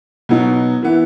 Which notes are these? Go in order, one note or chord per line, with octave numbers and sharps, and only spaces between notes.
B2 F#3 B3 D#4
E3 B3 E4